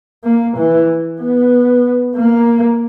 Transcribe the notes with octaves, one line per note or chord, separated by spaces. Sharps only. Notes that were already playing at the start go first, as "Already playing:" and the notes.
A#3
E3
B3
A#3